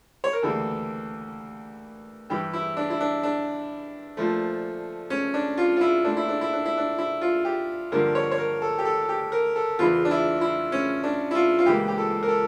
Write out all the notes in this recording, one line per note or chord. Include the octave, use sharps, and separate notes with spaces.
C#5
A#4
D2 C#3 E3 G3 A#3 A4
G2 E3 G3 G4
E4
D4
E4
D4
D4
A#2 F3 A3
C#4
D4
F4
F4
E4
A#2 A3 D4
E4
D4
E4
D4
E4
D4
E4
F4
G4
G2 D3 F3 A#3 A#4
C#5
C#5
A#4
A4
G4
A4
G4
A#4
A4
E2 C#3 E3 F4
D4
E4
E4
C#4
D4
E4
F4
F4
C#2 C#3 E3 A#3 G4
G4
A4
A#4
A4